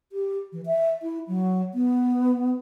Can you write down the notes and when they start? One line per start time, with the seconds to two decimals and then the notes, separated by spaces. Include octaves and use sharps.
0.12 G4
0.53 E3
0.66 E5
1.02 E4
1.27 F#3
1.74 B3